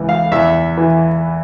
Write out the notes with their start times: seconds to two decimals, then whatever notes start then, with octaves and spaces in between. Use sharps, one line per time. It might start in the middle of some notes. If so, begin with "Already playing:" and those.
Already playing: C#2 E3
0.09 F5
0.32 E2 E5
0.77 E3